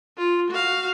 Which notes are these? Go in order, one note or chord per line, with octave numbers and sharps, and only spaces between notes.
F4
F#4 F5